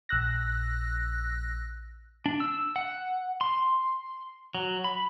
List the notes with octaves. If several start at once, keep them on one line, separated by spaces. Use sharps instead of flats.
A#1 E6 F#6 A#6
D4
E6
F#5
C6
F#3
B5